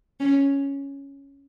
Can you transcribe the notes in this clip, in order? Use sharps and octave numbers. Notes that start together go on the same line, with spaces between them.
C#4